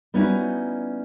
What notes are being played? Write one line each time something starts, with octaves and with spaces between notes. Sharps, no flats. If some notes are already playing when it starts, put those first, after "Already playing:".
G3 B3 C#4 D#4 E4 F#4